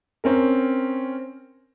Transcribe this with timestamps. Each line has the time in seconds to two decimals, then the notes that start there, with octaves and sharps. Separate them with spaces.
0.24 C4 C#4 A#4